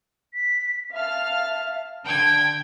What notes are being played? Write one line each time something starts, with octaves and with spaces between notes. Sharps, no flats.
B6
E5 F5 A5 F6
D3 G5 A5 G#6